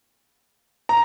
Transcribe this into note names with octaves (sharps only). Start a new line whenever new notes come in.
A#5